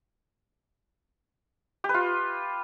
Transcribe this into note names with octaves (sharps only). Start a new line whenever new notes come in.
G4
B4
F4